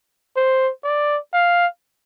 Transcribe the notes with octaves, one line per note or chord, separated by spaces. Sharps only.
C5
D5
F5